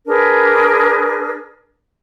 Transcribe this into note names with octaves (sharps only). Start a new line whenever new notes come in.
D4 G#4 A#4 B4